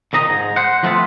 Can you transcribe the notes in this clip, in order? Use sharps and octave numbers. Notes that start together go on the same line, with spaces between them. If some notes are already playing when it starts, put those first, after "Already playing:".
F2 D#3 D#5 A#5
G#2
C5 F#5
F3 G3 A3 B3 C4 F4